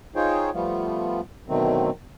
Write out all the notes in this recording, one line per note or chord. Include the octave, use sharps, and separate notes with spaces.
D#4 F4 G#4 C5 C#5 G5
F3 G3 A3 B3 F4
B2 D3 D#3 F#3 A3 C4